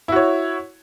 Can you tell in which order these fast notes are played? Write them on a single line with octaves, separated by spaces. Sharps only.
E4 F#4 C#5